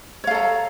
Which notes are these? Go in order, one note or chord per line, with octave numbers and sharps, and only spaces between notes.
A4 C#5 F5 A#5